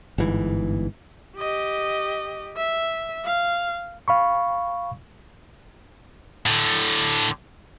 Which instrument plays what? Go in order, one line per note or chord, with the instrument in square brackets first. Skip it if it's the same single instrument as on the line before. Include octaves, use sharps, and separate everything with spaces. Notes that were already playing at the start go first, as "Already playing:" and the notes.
[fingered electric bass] G1 G#2 E3
[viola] G4 D#5
E5
F5
[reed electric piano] F5 B5 C#6
[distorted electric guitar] A2 D3